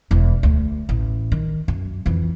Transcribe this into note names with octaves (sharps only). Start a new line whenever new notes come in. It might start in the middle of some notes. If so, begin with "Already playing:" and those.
E1 E2
D2
A1
D#3
F#2
F2 E3